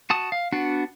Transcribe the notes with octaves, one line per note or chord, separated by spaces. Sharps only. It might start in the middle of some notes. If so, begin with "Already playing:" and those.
F#4 A5 D#6
F5
B3 D4 F#4 F#5